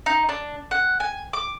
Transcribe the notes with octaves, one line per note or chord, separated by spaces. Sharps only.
D#4
D4
F#5
G#5
D6